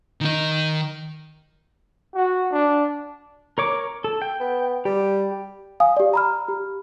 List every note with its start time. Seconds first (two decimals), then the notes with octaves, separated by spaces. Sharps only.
0.21 D#3 D#4
2.15 F#4
2.51 D4
3.58 A#4 C#5 D6
4.04 A4
4.22 G5
4.40 B3
4.85 G3 G4
5.80 F5 G#5 D#6
5.97 G4 D5
6.13 A#5 B5 F6
6.48 G4